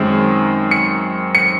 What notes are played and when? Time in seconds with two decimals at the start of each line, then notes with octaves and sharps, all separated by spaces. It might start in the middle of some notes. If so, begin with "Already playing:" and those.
Already playing: F#2 D#3 G#3 C4
0.71 C#7
1.35 C#7